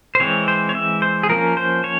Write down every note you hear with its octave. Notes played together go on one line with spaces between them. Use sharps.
C5
E3 G#3 C4 C#5
C5
C#5
E5
C5
G#4
F3 A#3 C#4 A#4
C5
C#5